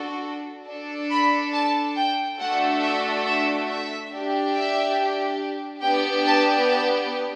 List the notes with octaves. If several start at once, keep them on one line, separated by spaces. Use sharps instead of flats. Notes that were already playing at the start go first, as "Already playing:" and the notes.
Already playing: D4 F#4 A4
D4 A4
B5
A5
G5
A3 D4 F#4 A4 F#5
E5
E5
E5
D4 G4
E5
B3 D4 G4 G5
A5
A5